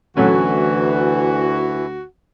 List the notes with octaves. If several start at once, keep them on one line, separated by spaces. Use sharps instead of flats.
D2 E3 F#3 A3 C#4 F#4